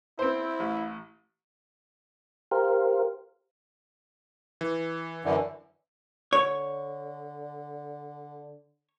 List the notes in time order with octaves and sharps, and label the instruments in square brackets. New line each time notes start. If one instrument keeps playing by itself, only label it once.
[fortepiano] C4 C5 [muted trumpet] E4
[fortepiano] A1
[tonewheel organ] G4 A#4 C5 F5
[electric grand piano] E3
[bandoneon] F#2 D3 E3
[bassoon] D3 [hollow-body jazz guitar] C#5